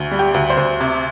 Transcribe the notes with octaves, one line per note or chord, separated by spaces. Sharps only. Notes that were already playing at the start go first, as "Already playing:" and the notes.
Already playing: D2
G3
G4 G5
D2
C5 C6
D2
C3